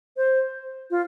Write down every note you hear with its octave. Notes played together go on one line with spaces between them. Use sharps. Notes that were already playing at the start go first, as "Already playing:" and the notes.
C5
F4